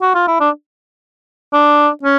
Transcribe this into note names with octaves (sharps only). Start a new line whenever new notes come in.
F#4
F4
E4
D4
D4
C#4